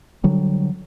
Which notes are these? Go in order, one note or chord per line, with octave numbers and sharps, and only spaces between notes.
D3 F#3 G3